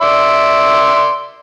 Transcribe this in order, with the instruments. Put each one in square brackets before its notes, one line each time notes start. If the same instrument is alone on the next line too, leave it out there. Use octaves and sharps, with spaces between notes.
[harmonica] D5 E5 C6